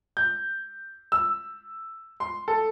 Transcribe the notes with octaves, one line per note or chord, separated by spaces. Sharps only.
G6
E6
C6
A4